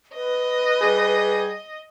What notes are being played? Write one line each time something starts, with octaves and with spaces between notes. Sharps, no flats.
B4 D#5
G3 G#4